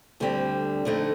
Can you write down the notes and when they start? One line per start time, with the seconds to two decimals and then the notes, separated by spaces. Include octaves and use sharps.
0.20 D2 D3 G3 C4
0.85 F2 D3 A3 D#4